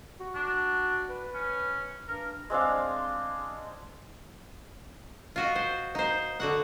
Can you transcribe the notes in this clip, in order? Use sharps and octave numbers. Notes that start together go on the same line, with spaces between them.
F#4
D4
B4
C#4
G2 A#4
G#3 C4 D4 F5
F4 F#4 D#5
C5
D#4 C5
D3 F#4 F#5